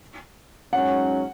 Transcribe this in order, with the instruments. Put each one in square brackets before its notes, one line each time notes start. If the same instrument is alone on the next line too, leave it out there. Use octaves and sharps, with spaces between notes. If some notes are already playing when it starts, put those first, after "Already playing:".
[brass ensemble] G#2 F#3 C#4 [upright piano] F#5